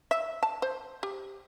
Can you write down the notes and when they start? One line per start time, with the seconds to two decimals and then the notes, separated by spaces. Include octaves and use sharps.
0.11 E5
0.43 A5
0.62 C5
1.03 G4